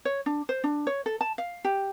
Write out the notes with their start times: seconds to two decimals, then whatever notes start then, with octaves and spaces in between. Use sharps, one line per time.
0.05 C#5
0.26 D4
0.49 C5
0.64 D4
0.87 C#5
1.06 A4
1.21 A5
1.38 F5
1.65 G4